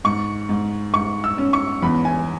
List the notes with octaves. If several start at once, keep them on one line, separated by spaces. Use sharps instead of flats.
G#2 C#6
G#2
G#2 C#6
E6
C#4
C#6
E2 B5
G#5